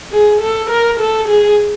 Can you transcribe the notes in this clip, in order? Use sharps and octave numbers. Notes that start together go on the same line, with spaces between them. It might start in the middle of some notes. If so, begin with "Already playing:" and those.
G#4
A4
A#4
A4
G#4